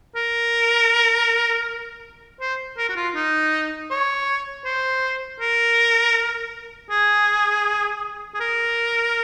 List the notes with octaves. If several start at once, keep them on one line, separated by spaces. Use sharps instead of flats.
A#4
C5
A#4
F#4
F4
D#4
C#5
C5
A#4
G#4
G#4
A#4